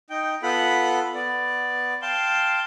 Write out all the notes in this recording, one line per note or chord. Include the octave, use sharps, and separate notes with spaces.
D#4 G5
B3 F4 A4 F#5 B5
B3 D5
F5 G5 A5 C6